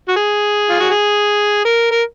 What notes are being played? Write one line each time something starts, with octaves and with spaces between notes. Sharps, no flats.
F#4
G#4
F4
F#4
G#4
A#4
A#4